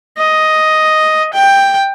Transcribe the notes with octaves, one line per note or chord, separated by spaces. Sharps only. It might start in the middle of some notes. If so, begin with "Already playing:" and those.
D#5
G5